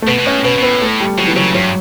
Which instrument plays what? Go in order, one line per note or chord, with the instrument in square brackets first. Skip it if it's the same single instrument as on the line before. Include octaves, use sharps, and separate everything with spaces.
[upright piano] A3
[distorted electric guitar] B2 [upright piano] B3
[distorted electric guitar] B2
[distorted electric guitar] A2 [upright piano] C#4
[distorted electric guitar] B2 [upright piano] B3
[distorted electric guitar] B2
[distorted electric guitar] A2 [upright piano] B3
[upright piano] A3
G3
[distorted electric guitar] B2 [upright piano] F#3
[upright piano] E3
[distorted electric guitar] C#3 [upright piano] F#3
[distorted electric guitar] G2 [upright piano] F#3